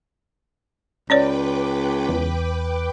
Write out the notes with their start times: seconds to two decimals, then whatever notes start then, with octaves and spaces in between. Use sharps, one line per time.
1.10 C#2 C#4 B4 C#5 D5 G5 D6
2.09 E2